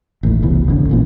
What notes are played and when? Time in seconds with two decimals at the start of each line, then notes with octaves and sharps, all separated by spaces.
0.23 A1 D#2 A2
0.42 F1 C2 B2 E3
0.67 F#1 F2 D3 C#4
0.89 A#1 A#2 E3